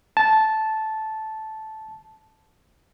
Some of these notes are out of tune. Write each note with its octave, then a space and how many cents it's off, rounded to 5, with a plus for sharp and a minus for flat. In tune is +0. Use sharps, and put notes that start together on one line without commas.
A5 -10